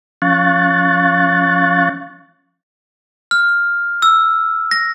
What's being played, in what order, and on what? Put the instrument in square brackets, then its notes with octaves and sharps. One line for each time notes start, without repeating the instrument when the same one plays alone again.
[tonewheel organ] F3 C#4 F5 C#6 F#6 A6
[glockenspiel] F6
E6
A#6